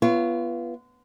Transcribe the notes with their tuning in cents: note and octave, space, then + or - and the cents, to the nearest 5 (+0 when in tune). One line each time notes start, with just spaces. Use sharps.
B3 -15 F4 -35 C#5 +0